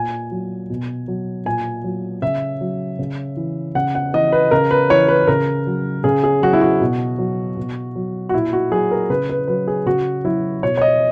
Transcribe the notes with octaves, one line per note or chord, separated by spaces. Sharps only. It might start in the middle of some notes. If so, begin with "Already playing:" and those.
Already playing: A#2 G#5
F#3
B2
F#3
A#2 G#5
F#3
C#3 E5
F#3
C#3
E3
C#3 F#5
F#5
E3 D#5
B4
C#3 A#4
B4
E3 C#5
B4
C#3 A#4
F#3
C#3 G#4
G#4
F#3 F#4
E4
F#4
B2
F#3
B2
F#3
F#4
A#2 E4
F#4
F#3 G#4
A#4
C#3 B4
B4
F#3 B4
G#4
C#3 F#4
F#3 E4
B2 C#5
C#5
D#5